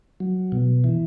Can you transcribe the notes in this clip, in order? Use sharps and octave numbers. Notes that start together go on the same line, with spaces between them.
F#3
B2
E3